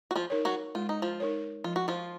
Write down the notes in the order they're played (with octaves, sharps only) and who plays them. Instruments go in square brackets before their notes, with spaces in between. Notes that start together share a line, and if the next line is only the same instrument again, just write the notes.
[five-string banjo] F#4
F3 F4
[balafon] D#4 A#4 C#5
[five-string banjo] F#3 F#4
[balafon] G#3 [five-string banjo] F4
[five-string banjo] D#4
F3 F4
[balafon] D#4 A#4 C#5
[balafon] F3 [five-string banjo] F4
[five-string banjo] F#4
F3 F4